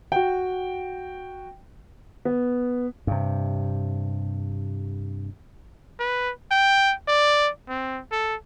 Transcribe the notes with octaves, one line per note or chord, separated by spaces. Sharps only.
F#4 G5
B3
G2 C3
B4
G5
D5
C4
A4